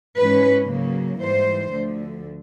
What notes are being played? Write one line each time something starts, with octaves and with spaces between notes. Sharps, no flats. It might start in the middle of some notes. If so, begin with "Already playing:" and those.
G#2 E3 G#3 C#4 B4
C#3 F#3 A#3
G#2 E3 G3 C5
D2 D3 F3 A3